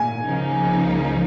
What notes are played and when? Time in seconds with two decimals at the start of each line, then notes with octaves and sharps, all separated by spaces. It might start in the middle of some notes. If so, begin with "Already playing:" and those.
Already playing: A#2 G#5
0.25 C#2 C#3 F3 A#3 D#4